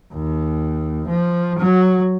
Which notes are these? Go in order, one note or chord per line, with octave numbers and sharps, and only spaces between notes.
D#2
F3
F#3